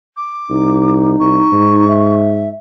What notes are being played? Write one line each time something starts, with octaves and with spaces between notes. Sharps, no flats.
D6
C2 D#4
C2 C#6
G#2
E5